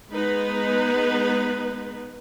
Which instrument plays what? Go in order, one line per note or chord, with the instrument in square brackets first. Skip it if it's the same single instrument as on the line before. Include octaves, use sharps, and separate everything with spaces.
[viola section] G#3 B3 D#4 B4